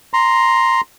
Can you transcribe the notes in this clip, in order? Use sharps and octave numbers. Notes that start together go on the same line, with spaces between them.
A#5 C6